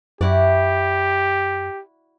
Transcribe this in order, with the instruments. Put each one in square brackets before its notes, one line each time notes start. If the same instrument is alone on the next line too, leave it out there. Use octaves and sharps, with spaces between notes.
[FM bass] F#2 [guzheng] E4 F#4 D5 [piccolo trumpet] G4